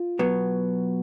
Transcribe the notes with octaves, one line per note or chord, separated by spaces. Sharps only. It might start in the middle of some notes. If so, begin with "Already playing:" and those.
Already playing: F4
B2 F#3 B3